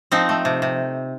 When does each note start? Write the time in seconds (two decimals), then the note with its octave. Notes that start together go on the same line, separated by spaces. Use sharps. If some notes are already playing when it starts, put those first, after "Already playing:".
0.12 F3 C4 D#4
0.29 A3
0.45 C3
0.62 C3